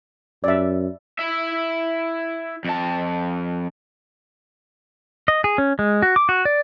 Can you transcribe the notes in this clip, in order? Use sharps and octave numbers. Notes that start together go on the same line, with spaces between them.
F#2 D5 E5
E4 E5
F2 A5
D#5
G#4
C#4
G#3
F#4
D6
F#4
D5